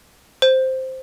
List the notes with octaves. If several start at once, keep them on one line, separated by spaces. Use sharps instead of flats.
C5